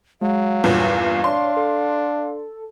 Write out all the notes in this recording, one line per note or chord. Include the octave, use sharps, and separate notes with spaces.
F#3 G#3 F5
E2 G2 A#2 C7
D4 C#5 C6
A4